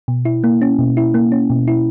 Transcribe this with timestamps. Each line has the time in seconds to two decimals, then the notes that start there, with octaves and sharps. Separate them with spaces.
0.08 B2
0.25 E4
0.44 A#3
0.62 C#4
0.79 B2
0.97 E4
1.14 A#3
1.32 C#4
1.50 B2
1.68 E4